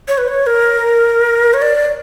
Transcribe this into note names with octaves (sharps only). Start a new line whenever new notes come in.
C#5
B4
C#5
A#4
C#5
D5
D5